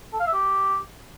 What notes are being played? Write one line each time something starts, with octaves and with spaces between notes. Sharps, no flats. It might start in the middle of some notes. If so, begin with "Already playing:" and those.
A4
F5
E5
G4